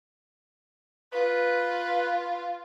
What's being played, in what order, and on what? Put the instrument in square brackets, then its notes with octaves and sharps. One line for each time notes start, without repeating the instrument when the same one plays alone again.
[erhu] F4 [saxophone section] B4